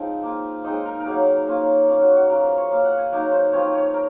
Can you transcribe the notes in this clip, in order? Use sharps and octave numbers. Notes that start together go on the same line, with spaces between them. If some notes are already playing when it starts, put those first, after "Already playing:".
Already playing: F3 G#3 C4 D#4
A#3 F4
G#3 C4 D#4 D#5
A#4
A#4
F#3 A#3 D#4 G#4
A#3 C#4 F4
A#3 C#4 F4
F#4
F#4
F#3 C#4 F4 A#4
C5
C#5
A#3 F4 F5
F#5
G#5
F#3 A#3 D#4 A#4
C5
F3 C4 F4 C#5
C#5
A#4